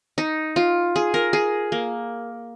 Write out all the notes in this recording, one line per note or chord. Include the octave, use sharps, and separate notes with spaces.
D#4
F4
G#4
A#4
G#4
A#3